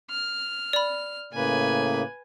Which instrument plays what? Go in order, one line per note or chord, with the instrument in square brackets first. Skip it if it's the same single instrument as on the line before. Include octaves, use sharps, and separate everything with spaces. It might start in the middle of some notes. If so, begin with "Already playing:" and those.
[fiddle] F6
[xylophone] D5 B5
[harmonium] A2 C#3 A#3 [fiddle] B4 G#5